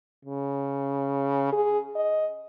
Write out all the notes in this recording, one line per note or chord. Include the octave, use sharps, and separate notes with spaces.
C#3
G#4
D#5